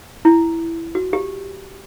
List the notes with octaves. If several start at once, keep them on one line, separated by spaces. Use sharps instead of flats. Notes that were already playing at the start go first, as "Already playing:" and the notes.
E4
F#4
G4